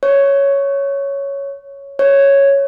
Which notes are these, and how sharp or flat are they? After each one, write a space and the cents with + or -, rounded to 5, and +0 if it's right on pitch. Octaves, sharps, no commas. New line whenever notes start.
C#5 +5
C#5 +0